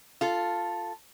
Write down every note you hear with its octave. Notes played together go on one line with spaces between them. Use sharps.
F4 A4